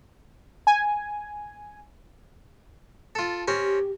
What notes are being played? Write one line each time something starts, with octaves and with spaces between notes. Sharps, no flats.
G#5
F4 A4 A5
C4 C#4 G4 A#4